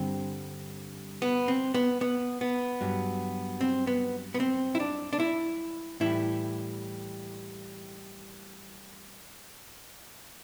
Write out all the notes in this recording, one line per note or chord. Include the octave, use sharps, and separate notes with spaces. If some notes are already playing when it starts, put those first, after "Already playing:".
Already playing: G2 D3 G3 C4
B3
C4
B3
B3
B3
G2 F#3
C4
B3
B3
C4
E4
D4
D4
E4
A2 E3 G3 E4